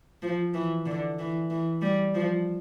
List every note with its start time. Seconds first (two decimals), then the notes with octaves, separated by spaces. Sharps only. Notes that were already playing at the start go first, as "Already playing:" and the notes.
0.22 F3
0.54 E3
0.86 D3
1.19 E3
1.50 E3
1.82 G3
2.14 F3